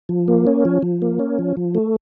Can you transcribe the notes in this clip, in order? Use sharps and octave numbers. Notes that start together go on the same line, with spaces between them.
F3
A#3
C#4
F3
F3
A#3
C#4
F3
F3
A3